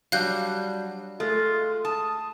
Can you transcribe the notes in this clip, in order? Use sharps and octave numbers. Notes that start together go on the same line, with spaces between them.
F#3 G3 D4 F5 F#6 G6
G#3 A3 F4
A5 D#6